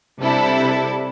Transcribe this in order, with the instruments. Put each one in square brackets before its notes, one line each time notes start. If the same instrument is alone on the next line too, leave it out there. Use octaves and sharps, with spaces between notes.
[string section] C3 G3 D4 E4 A4